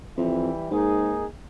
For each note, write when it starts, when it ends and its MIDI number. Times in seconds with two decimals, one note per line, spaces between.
0.18 0.50 41
0.18 0.70 52
0.18 0.70 55
0.18 0.70 64
0.71 1.18 44
0.71 1.26 58
0.71 1.26 63
0.71 1.26 68